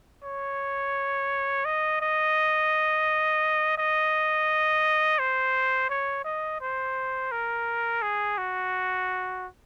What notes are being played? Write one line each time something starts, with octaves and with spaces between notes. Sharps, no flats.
C#5
D#5
D#5
D#5
C5
C#5
D#5
C5
A#4
G#4
F#4